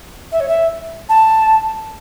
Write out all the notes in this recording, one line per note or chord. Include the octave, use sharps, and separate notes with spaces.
E5
C#5
E5
A5